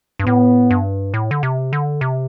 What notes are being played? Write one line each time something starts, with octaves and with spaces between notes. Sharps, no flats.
G2
A2 B3
G2
A2
D3
C3
D3
C3